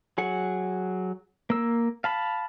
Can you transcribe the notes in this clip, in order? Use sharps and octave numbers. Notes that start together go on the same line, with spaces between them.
F#3 G#4 F#5
A#3 E6
F5 A5 B5